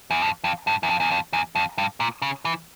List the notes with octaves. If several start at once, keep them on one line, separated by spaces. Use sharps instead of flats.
E2
F2
F2
G2
E2
F2
E2
F2
E2
F2
G2
A#2
C#3
E3